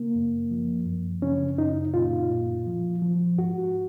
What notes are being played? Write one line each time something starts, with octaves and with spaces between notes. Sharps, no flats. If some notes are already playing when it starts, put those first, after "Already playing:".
Already playing: C#3 A#3
F#2
F3
F#2
C#3 C#4
F#2 D#4
A#2 F4
A#2
F3
F3
G#2 F#4